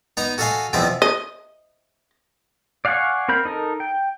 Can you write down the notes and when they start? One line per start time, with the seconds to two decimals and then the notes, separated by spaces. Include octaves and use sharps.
0.17 B3 D#4 D#5 A#5
0.38 F#4 A4 D#5 F5 G#5 C6
0.73 E2 B2 F3 C4 E5 A5
1.02 D#5
2.85 D5 F5 F#5 G#5 C#6
3.28 C4 A#4 B5 G6
3.45 D#4 A4 A#4
3.80 G5